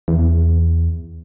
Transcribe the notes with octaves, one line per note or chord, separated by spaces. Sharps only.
E2